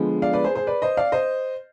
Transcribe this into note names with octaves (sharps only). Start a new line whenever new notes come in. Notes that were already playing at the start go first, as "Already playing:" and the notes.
Already playing: D3 F3 G#3 B3
D5 F5
B4 D5
G#4 C5
G#4 C5
B4 D5
C5 D#5
D5 F5
C5 D#5